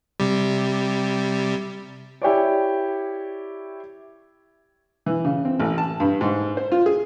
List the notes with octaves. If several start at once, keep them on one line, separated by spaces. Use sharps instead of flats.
C3 G3
E4 G4 C#5 D5
E3
C#3
C4
A1
A5
G2
G#2
C5
F4
G#4